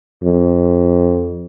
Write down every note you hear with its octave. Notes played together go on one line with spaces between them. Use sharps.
F2